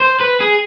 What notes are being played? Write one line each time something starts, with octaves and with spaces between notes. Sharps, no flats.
C5
B4
G#4